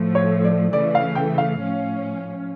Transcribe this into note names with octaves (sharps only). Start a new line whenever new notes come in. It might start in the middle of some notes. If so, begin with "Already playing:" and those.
Already playing: A2 F3 A3
C#5
D5
C#3 E3 A3 D5
F5
G5
F5
A2 F3 C#4